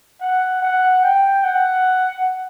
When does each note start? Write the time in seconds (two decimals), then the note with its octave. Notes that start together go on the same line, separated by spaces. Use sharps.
0.21 F#5
0.62 F#5
1.04 G5
1.44 F#5